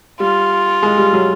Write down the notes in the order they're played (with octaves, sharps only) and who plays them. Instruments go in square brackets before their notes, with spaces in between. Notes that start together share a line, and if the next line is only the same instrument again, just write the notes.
[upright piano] G3 [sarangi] F4
[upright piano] G#3
G3
F#3